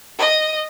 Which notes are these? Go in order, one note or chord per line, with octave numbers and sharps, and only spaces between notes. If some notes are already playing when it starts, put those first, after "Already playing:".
D#5